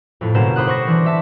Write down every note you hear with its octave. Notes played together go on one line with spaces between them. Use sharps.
F2 A2
G1 B2 A#3 C#4 C5 E7
G4 C5 B5 D#6 F#6
C5 C#6 A#6
E3 D4
G4 E5 A5